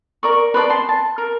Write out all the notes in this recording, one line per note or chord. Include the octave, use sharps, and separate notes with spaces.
A#4 D5 C#6
B4 C5 D5 A5
A5 C6
A5
A#4